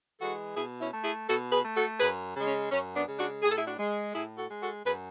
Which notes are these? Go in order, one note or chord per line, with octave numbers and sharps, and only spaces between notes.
E3 G#3 F#4 A4
B2 E4 G#4
C#4 E4
A3
E4 G#4
B2 F#4 A4
G#4 B4
A3
F#4 A4
F#2 G#4 B4
C#3 G#3
C#4
F#2 C#4
B3 D4
C#3 G#3
D4 F#4
A2 G#4
A4
E4 G#4
D4 F#4
G#3
A2 E4 G#4
F#4 A4
G#3
F#4 A4
F#2 G#4 B4